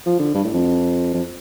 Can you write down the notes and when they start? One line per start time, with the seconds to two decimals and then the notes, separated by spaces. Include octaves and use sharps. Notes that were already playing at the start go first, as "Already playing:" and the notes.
0.06 F3
0.19 D3
0.34 G2
0.44 A2
0.54 F2
1.14 F2